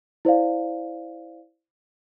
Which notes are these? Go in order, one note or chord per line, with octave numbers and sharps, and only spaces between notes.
E4 C5 D5 F5